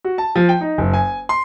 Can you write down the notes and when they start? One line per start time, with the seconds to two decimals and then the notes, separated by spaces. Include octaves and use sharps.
0.05 F#4
0.18 A5
0.36 F3
0.49 G5
0.61 D#4
0.78 F#1
0.93 G#5
1.29 C6